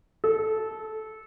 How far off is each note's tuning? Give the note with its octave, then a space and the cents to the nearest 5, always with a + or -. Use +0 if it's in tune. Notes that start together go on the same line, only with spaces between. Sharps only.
A4 -15